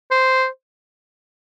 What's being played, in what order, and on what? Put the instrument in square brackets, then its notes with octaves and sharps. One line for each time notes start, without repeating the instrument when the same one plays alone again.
[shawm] C5